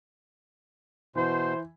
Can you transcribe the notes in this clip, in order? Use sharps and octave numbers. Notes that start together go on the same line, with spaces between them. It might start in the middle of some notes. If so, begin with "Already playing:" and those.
B2 E3 E4 C5